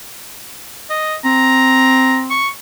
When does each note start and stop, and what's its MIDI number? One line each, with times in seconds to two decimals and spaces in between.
0.90 1.15 75
1.25 2.43 60
1.25 2.18 82
2.30 2.48 85